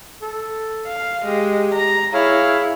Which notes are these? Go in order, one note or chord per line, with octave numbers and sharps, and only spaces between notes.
A4
F5
G#3 G4
A#5
E4 G#4 C#5 F5